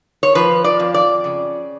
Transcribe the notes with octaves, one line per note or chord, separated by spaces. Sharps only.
C#5
F3 B4
D5
F2
D5
C#3